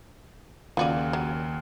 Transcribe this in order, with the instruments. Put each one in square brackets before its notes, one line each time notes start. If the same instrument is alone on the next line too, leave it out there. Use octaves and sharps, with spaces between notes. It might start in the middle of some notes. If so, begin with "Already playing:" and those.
[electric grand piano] D#2 C#3 D#7 [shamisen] F4 F#4 D5
[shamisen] F#3